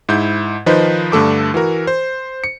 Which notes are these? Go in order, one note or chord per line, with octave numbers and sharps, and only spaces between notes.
G#2 E4 G6
D#3 F3 D#4 B4 C5 D#5
G2 D3 A3 A4 D6
E3 F#4 A#4
C5
C#7